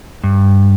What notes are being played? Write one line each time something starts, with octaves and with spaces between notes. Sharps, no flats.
G2